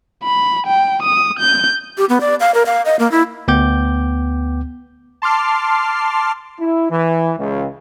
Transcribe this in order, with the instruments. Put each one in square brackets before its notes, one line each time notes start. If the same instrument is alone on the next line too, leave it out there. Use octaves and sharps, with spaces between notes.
[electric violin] B5
G5
D#6
G6
[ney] G4
B3
D5
F5
A#4
F5
D#5
A#3
E4
[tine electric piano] D2 B3 G5 D6 G6
[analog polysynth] A5 C6 D6 F6 C7
[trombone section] E4
E3
C#2